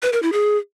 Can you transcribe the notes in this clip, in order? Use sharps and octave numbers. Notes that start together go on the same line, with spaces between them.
B4
A#4
E4
G#4